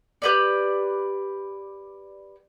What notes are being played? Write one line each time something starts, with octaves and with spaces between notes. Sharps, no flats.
G4 B4 D5